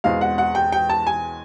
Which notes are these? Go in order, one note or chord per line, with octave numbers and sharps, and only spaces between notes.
E1 E2 B2 G#3 C4 F5
F#5
F#5
G5
G5
A5
G#5